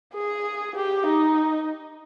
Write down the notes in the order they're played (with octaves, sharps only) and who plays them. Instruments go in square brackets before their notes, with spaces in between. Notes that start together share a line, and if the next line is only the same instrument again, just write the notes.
[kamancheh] G#4
G4
D#4